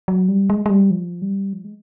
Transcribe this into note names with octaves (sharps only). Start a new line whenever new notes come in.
F#3
G3
G#3
G#3
G3
F3
G3
F3
G#3